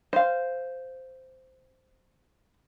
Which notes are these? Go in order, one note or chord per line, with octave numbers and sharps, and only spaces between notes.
C5 F5